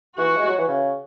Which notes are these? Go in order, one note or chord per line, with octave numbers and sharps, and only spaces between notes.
E3 F#4
G#3
F#3
E3
C#3